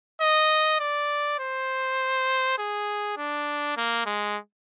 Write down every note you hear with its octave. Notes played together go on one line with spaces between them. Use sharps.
D#5
D5
C5
G#4
D4
A#3
G#3